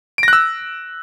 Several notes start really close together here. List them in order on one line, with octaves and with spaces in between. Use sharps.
D7 A#6 F#6 E6